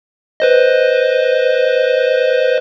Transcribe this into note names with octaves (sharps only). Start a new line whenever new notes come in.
B4 C5 D#5